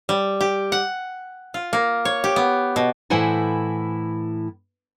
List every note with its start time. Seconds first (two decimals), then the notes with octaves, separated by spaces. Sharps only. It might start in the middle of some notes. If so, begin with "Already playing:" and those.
0.09 G3
0.41 G4
0.72 F#5
1.54 F4
1.73 A#3
2.05 C#5
2.24 G4
2.36 B3
2.76 B2
3.10 A2 E3 E4 C5 F#5 G#5